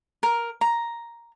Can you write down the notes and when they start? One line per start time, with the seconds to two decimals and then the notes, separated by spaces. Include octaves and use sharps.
0.23 A#4
0.61 A#5